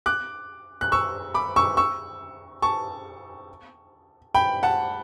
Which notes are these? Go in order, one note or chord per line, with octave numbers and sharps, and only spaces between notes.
D6 F#6
F#6
C#6 E6
B5 D6
C#6 E6
C#6 E6
A5 C#6
G5 B5
F#5 A5